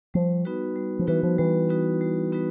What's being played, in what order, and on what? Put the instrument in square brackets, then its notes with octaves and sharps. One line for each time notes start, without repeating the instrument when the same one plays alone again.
[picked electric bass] F3 [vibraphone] G3
[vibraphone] B3 D#4 F#4 B4
G3
[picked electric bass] F3
[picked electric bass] E3 [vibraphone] B3 D#4 F#4 B4
[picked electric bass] F3
[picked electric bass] E3 [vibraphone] G3
[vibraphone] B3 D#4 F#4 B4
G3
B3 D#4 F#4 B4